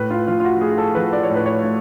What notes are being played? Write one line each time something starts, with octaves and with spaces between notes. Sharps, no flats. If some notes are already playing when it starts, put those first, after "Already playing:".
Already playing: A2 B4
F4
F3 F4
F4
F#4
A3 G#4
A4
F3 B4
D5
C#5
A2
B4
C#5
A3